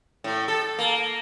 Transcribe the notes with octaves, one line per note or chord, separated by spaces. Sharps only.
A2
A4
A#3